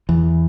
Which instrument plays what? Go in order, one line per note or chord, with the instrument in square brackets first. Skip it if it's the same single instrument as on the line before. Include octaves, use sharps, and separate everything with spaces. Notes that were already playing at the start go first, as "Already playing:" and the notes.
[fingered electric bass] E2 E3